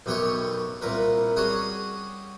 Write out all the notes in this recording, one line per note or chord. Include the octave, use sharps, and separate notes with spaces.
B1 F#2 B3 G4 C#5 C#6
C2 A#2 A#4 B4
G3 C#4 F#4 G#4 C#5 F#5